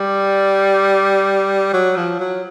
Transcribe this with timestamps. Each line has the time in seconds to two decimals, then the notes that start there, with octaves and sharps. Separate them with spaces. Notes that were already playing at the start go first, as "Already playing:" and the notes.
Already playing: G3
1.73 F#3
1.96 F3
2.19 F#3